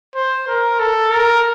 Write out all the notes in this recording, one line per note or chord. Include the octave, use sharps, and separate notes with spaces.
C5
A#4
A4
A#4